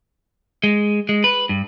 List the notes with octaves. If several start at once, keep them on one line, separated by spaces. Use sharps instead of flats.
G#3
G#3
B4
G2